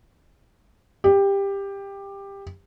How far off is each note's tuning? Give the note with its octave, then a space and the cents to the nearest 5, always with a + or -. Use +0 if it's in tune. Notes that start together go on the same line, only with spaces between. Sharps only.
G4 +15